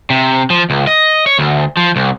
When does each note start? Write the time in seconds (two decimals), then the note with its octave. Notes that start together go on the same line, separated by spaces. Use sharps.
0.10 C3
0.50 F3
0.70 C#2
0.87 D#5
1.26 C#5
1.39 D2
1.77 F3
1.96 C2